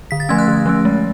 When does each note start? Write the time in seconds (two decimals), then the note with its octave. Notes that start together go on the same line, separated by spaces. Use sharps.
0.11 D3 B6
0.20 A6
0.29 F3 A3 C#4 G#6
0.38 F#6
0.48 D3
0.66 F3 A3 C#4
0.85 G#3